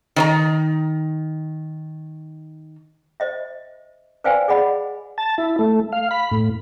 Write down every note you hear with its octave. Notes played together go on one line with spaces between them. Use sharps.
D#3 C5 A#5
C5 D#5 E5
B4 C5 D5 F5 G5 G#5
G#4 D5 D#5 F#5 B5
A5
E4
A3
F5
B5
A2